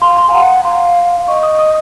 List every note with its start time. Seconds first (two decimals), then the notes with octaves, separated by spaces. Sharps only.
0.01 F5 C6
0.17 C6
0.29 G#5
0.33 F#5 A#5
0.64 F5 C6
1.28 D#5 C#6
1.43 D#6
1.59 D#6